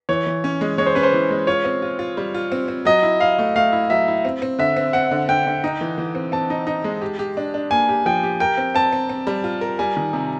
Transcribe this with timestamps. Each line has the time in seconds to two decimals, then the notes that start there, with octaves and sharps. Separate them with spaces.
0.09 E3 C#5
0.26 E3
0.44 C#4
0.61 G#3
0.78 G#3 C#5
0.86 C5
0.95 C#4 B4
1.03 C5
1.13 E3
1.31 G#3
1.47 F4 C#5
1.65 C4
1.82 F4
1.99 F4
2.17 G3
2.34 F4
2.52 C4
2.68 C4
2.85 F#3 D#5
3.03 E4
3.20 E4 F5
3.39 A3
3.56 A3 F5
3.72 E4
3.90 F#3 E5
4.08 E4
4.25 C4
4.42 C4
4.59 D3 E5
4.77 C4
4.93 C4 F#5
5.11 D3
5.29 D3 G5
5.46 D3
5.64 D#4
5.81 E3
5.98 E3
6.15 C4
6.32 C4 A5
6.50 D#4
6.67 D#4
6.84 G#3
7.02 G4
7.19 G4
7.37 D4
7.54 D4
7.71 A#3 G#5
7.89 G4
8.06 F3 G5
8.23 G4
8.40 A#4 G5
8.57 C4
8.75 C4 A5
8.93 C4
9.09 C4
9.27 G3
9.44 F4
9.61 A#4
9.79 G3 G#5
9.97 D#3
10.13 C3